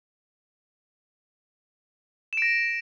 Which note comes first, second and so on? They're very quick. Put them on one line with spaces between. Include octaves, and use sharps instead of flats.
E7 D7 A#6